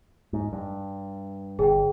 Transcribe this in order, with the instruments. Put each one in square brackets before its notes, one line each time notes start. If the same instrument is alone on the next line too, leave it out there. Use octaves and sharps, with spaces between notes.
[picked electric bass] G#2
G2
[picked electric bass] G1 [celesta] G#4 G5